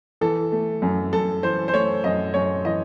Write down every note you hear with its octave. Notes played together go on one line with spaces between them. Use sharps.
E3 A4
A3
F#2
F#2 A4
E3 C5
C5
A3 C#5
F#2 D#5
F#2 C#5
E3 D#5